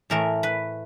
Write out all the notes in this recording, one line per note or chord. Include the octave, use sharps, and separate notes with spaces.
A2 E3 A3 A#4
B4